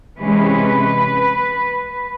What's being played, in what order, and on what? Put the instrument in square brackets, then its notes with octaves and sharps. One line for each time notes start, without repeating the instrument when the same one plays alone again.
[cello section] C3 E3 G#3 C#4 B4